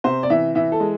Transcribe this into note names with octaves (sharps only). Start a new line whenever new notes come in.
C3 C5
D5
E3 E5
E3 E5
A4
G#3